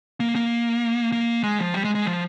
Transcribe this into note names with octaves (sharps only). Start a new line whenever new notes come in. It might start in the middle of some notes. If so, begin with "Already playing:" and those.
A#3
A#3
A#3
G#3
F3
G3
G#3
G#3
F3